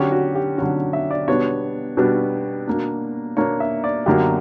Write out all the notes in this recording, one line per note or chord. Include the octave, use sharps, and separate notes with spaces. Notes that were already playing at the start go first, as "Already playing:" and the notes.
Already playing: D3 F#3 C#4 G4
F#4
G4
D3 F#3 C#4 F#4
E5
D5
B2 G3 B3 D4 C#5
B2 G3 B3 D4
B2 A#3 D4
B2 A#3 D4 C#5
E5
D5
F#2 D3 F#3 A#3 G4